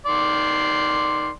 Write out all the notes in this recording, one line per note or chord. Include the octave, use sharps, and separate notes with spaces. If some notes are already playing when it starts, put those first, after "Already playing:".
D#3 D5 C6